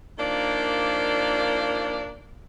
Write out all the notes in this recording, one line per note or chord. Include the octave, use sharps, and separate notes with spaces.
D#3 F3 A#3 D4 D5